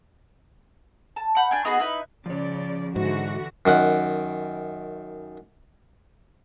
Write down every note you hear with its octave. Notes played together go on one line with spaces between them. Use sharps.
A5
F#5 B5 G6
D4 G5 G#5
B3 D#4 F#4 G#4
D#4 E4 B4
C#3 F3 C#5 D5
G#2 D3 E3 F#4
F#2 D#3 F#5